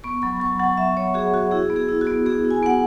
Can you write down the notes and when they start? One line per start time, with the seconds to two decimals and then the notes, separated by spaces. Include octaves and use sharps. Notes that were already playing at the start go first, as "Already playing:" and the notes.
0.04 B3 C#6
0.22 F#3 B5
0.40 F#3 C#6
0.60 F#3 F#5
0.77 F#3 E5
0.97 F#3 C#5
1.14 F#4 G#4
1.34 F#4
1.51 E4 G#4
1.70 B3
1.76 G#4
1.89 E4
2.01 F#4
2.07 B3
2.26 B3 G#4
2.45 E4
2.51 G#5
2.63 B3 F#5